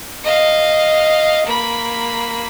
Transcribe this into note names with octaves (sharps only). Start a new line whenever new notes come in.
D#5 F5
A#3 B5